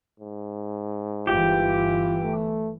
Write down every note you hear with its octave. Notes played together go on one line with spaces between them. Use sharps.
G#2
G1 E3 F4 G4
A3